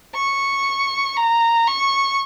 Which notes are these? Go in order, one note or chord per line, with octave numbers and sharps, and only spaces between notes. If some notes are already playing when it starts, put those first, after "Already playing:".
C#6
A#5
C#6